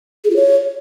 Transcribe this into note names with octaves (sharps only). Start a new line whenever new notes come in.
G#4
F4
C#5